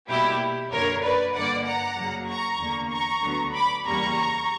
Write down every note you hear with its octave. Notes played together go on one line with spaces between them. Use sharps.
B2 G3 A#3 E4 G4
F#2 D3 A#3 A#4 C#5
B4 D5
G2 D3 A#3 D5 F#5
F#5 A#5
F#2 C#3 F#3 A#3
A#5 C#6
E2 D3 A#3
A#5 C#6
D2 D3 F#3 B3
B5 D6
E2 C#3 G3 A#3 A#5 C#6